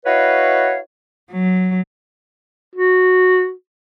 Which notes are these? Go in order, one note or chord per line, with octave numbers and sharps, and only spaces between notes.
E4 F#4 B4 C#5 D#5 F5
F#3
F#4